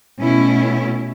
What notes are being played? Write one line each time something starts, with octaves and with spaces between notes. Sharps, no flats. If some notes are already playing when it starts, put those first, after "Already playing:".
B2 A3 C#4 E4